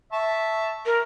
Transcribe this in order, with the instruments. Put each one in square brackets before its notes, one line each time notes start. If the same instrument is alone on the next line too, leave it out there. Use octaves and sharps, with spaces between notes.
[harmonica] E5 A5 C#6
[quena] A#4